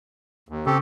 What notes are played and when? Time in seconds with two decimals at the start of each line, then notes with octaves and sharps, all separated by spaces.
0.49 D#2
0.66 C#3 C4 G4 A4